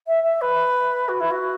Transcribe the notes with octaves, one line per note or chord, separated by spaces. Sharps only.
E5
E5
B4
F#4
E4
F#4